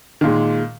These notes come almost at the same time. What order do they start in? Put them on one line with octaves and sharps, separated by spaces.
D#3 A#2 G#3